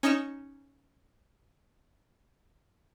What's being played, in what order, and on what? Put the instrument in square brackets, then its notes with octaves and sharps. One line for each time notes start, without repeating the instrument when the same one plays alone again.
[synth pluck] C#4 D#4 D#5 C#7 E7